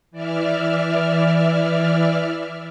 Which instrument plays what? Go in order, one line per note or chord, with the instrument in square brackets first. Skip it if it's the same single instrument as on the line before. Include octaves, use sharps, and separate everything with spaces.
[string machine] E3 D5 E5 F6